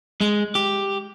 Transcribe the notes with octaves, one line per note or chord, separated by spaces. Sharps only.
G#3
G4